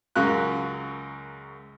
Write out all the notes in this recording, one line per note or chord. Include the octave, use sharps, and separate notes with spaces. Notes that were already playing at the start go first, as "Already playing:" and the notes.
C#2 F#2 A#4 F5 F#6